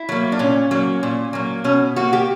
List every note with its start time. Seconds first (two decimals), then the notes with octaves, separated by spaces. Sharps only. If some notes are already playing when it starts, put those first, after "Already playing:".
Already playing: E4
0.09 F#3 A#3
0.32 D4
0.39 A#2 C#4
0.71 F#3 A#3
1.03 A#2
1.33 F#3 A#3
1.64 B2 C#4
1.96 A#3 F#4
2.13 G4